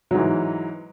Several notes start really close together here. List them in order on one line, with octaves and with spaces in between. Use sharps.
F#3 G#2 E3